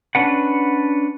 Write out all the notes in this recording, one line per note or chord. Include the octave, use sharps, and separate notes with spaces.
C#4 D4 B4 F#5